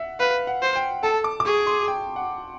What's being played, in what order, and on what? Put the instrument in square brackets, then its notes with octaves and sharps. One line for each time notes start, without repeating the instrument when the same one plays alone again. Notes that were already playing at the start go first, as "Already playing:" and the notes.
Already playing: [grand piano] E5 F#5
[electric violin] B4 [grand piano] F5
[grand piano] F#5
[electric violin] C5
[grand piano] G5
[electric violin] A4 [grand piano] A5
[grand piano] D6
D6
[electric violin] G#4 [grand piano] C#6
[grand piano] C6
G5
F#5